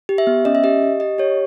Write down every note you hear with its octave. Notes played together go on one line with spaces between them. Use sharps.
G4
E5
B3
C#4 D#5
E5
G4 D#5
G4
G4 D#5
G4 C#5